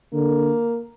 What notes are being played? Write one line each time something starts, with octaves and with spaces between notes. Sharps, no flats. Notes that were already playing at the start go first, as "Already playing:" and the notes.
D3 A#3